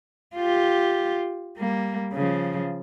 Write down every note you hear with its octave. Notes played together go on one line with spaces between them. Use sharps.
F4 G4
G3 A#3
C#3 F3